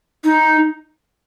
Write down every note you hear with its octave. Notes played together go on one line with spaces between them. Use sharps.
D#4